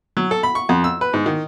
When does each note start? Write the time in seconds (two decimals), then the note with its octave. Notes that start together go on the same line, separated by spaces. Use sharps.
0.17 F#3
0.31 A4
0.43 B5
0.55 C#6
0.69 F2
0.84 E6
1.01 B4
1.14 G#2
1.26 D#3